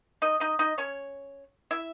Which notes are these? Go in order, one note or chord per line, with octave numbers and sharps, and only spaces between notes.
D#4 D#5
D#4 D#5
D#4 D#5
C#4 C#5
E4 E5